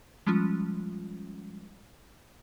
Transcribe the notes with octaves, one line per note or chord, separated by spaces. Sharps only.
F3 G3 G#3 C#4 F4